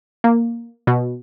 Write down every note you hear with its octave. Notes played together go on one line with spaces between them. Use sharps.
A#3
B2